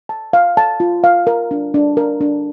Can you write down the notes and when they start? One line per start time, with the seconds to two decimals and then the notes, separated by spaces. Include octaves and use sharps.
0.09 A5
0.33 F5
0.57 A5
0.80 F4
1.04 F5
1.27 A#4
1.51 D4
1.74 D4
1.97 A#4
2.21 D4